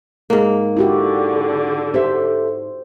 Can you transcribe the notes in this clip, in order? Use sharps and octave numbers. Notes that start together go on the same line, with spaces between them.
G#2 A#3
D3 E4 F#4 G4
G4 A4 C5 E5